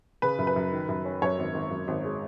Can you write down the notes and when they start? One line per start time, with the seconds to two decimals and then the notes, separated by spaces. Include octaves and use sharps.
0.22 C#3 B4
0.39 F#2
0.47 B4
0.56 F#2
0.72 D#3
0.89 F#2
1.05 C#4
1.22 F#2 C#5
1.38 G#1
1.54 G#1
1.71 F#2
1.88 G#1
2.05 G#3